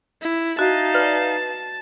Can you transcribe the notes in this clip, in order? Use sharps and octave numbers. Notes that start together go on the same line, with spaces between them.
E4
D#4 F#4 E5 F5 A5
B4 D5 F6